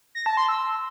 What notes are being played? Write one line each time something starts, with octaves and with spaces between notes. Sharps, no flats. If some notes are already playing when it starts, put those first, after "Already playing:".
A#6
A5
C6
E6